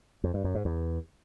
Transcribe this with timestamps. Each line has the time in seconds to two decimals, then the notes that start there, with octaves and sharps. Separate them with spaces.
0.24 F2
0.34 G2
0.44 F#2
0.55 G#2
0.65 E2